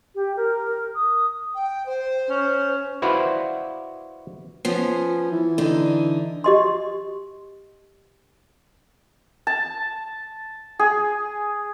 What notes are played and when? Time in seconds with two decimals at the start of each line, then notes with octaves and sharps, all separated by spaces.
0.15 G4
0.37 A#4
0.95 D#6
1.55 G5
1.86 C5
2.30 C#4
3.02 E4 F#4 B4 C5 D5 F5
4.65 F3 B3 C#4
5.32 E3
5.58 D3 D#4
6.44 G4 D#5 C6
9.47 A5
10.79 G#4